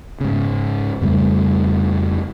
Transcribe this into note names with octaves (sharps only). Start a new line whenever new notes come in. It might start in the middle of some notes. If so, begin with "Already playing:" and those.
G#2 C#3
F2 C#3 G3 A3